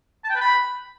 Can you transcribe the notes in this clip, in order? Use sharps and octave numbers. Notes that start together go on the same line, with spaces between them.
A5
G5
B4
B5